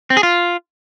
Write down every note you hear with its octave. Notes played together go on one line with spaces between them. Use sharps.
C4
G#4
F4